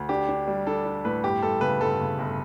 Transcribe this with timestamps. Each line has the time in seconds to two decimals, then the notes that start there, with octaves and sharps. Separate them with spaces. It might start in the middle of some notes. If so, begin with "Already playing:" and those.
Already playing: D2
0.09 D4 G4
0.29 D4
0.48 G3
0.67 D4 A4
0.85 D4
1.05 A2 B4
1.23 G1 G4
1.42 G1 A4
1.61 C#3 B4
1.80 G1 A4
2.00 C#3
2.19 G1